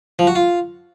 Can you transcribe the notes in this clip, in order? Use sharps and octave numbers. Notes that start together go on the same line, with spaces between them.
F3
F#4
F4